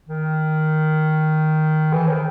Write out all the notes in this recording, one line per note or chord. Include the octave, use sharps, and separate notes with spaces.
D#3
E3
D#3